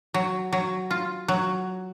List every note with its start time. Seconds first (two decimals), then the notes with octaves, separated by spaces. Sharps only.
0.14 F#3
0.53 F#3
0.91 F4
1.28 F#3